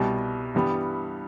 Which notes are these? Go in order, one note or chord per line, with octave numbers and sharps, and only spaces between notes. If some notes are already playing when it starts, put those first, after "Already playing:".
Already playing: C2 B2 G3
G2 E3 G3 B3